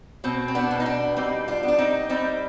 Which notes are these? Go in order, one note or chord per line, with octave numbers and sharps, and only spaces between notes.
B2 C4
C4
B3 D4
B2
D#4
B3 D4
G3 C4 D#4
D4 F4
B3
D4
C4 D#4
G3 C4 D#4